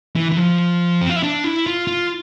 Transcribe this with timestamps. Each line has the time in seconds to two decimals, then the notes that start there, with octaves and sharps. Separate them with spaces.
0.16 E3
0.32 E3
0.37 F3
1.02 C4
1.09 F4
1.16 E4
1.23 D4
1.44 E4
1.67 F4
1.87 F4